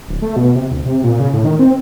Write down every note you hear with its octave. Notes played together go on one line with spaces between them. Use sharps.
D1
A3
B2
C3
D2
C3
A#2
C#3
A2
D#3
C4